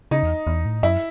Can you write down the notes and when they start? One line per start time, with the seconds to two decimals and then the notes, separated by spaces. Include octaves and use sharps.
0.11 C#3 D#4 D#5
0.23 E2
0.47 E2
0.65 A2
0.83 F#2 E4 E5